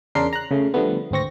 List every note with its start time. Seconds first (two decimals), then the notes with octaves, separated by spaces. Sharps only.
0.15 E2 C#3 D4 A#4 C6 C7
0.33 A#5 F#6
0.51 C#3 A3
0.74 D3 F3 G3 A3 B3
1.11 G#1 D2 C4 C#6 A#6